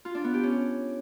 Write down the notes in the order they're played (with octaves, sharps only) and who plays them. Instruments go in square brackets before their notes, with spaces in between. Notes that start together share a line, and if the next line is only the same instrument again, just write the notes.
[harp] F4
D4
B3
G4
C#4